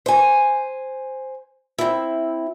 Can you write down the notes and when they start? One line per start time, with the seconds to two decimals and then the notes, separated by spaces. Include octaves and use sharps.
0.06 C5 G#5
1.78 C4 E4